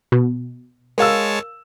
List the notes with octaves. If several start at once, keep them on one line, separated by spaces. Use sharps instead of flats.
B2
G#3 A#4 C#5 F5 A5 E6